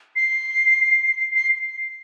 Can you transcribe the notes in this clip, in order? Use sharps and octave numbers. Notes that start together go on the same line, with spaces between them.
C7
C7